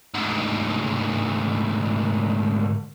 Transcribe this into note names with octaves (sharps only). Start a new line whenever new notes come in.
D2 G#2